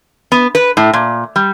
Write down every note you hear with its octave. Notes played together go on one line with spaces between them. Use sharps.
B3
B4
A2
A#2
G3